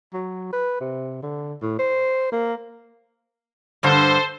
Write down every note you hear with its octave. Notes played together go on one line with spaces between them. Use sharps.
F#3
B4
C3
D3
A2
C5
A#3
G2 D3 G3 A4 C5